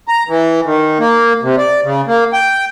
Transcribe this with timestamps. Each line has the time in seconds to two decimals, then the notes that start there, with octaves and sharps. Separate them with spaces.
0.08 A#5
0.28 E3
0.66 D#3
0.99 A#3
1.43 C3
1.58 D5
1.84 C#3
2.07 A#3
2.33 G5